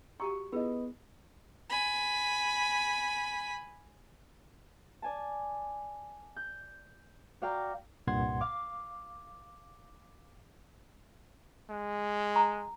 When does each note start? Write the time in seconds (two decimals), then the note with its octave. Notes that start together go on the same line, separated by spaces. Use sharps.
0.20 F#4 G4 A#5 C#6
0.52 B3 E4 F4 G#4 D#5
1.70 G#5 B5
5.02 D5 G#5 A5
6.36 G6
7.42 F#4 D5 F5 G5 A#5
8.07 C2 G2 A#2 F#5 C6 G#6
8.41 F5 D6
11.70 G#3
12.36 A#5